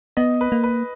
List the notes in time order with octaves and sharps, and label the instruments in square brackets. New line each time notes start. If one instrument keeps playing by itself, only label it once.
[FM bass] B3 [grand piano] D#5
[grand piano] B4
[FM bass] A#3
[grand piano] B4